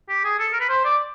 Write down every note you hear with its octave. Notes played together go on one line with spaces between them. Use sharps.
G4
G#4
A4
A#4
B4
C5
D5